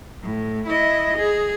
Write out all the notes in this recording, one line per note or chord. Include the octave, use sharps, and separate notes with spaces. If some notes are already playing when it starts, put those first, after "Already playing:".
A2
E4 D#5
G#4